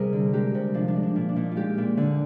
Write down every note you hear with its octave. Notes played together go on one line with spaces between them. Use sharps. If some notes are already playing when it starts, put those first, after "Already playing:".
Already playing: C3 G3 G#4 A#4
D3
G#3 G4
C3
F3 D4
D4
G#3
D4
A#2
D4
A#2 D#4
F4
G#3 G4
A#2
D3